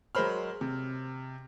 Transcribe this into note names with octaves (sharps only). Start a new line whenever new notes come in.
F#3 G#3 A#4 C5 B5 F6
C3